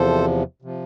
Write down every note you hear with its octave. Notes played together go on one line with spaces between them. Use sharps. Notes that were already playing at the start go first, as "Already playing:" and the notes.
Already playing: E2 C3 F3 A4 C5
C3 F3